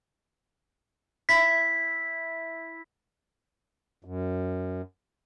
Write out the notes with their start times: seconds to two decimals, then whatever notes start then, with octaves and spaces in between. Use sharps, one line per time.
1.29 E4 B6
4.05 F#2